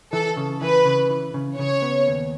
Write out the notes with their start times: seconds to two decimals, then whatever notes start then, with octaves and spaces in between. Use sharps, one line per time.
0.13 E3 A4
0.37 C#3
0.62 E3 B4
0.85 C#3
1.10 E3
1.34 C#3
1.58 C#3 C#5
1.82 B3
2.07 D#2